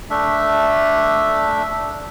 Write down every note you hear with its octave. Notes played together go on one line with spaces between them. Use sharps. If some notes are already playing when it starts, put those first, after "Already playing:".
A3 D4 E5